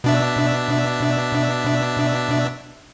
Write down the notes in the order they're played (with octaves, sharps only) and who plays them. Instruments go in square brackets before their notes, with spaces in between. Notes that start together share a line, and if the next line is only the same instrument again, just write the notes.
[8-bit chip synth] B2 D4 E5